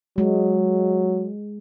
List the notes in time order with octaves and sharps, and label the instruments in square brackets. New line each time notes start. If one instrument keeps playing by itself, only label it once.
[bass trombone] F#3 [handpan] G#3